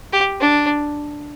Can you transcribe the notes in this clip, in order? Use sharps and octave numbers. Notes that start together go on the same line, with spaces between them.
G4
D4